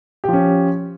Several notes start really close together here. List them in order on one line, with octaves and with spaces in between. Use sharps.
G4 F3 C#4